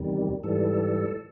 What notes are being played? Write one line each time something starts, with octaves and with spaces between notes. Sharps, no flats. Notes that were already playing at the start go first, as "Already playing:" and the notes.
Already playing: E2 C3 D#3 G3
G#2 E3 G3 A4